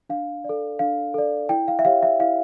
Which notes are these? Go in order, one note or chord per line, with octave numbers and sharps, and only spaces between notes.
D4 F5
A4 D5
D4 F5
A4 D5
E4 G5
F5
E5
G4 C#5 F5
E5
E4 F5